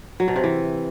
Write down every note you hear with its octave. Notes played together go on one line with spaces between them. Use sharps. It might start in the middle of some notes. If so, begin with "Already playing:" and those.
F#3
B2
C3
E3